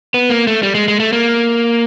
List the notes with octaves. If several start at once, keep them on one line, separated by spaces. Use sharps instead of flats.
B3
A#3
A3
G3
G#3
G#3
A3
A#3